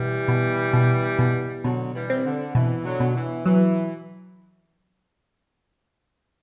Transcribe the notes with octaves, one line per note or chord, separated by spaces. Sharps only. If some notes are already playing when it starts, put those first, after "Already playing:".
Already playing: B2 E3 G3
B2
B2
B2
B2 D3 F#3
E3 G3
C4
D3
B2 E3
D3 F#3
B2
E3
E3 F#3